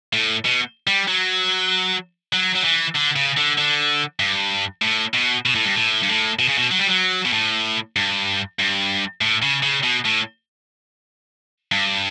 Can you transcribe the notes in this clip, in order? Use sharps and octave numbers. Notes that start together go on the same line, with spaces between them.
A2
B2
G3
F#3
F#3
F#3
E3
D3
C#3
D3
D3
G2
A2
B2
B2
A2
G2
A2
G2
A2
B2
C#3
B2
F#3
G3
F#3
B2
A2
G2
G2
A2
C#3
C#3
B2
A2
G2